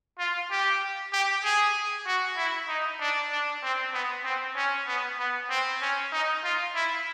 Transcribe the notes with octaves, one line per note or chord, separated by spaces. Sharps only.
F4
G4
G4
G#4
F#4
E4
D#4
D4
D4
C4
B3
C4
C#4
B3
B3
C4
C#4
D#4
F4
E4